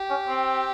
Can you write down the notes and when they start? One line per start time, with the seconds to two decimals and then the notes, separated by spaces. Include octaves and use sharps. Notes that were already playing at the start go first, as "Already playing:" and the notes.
Already playing: G4
0.10 C#4
0.29 C4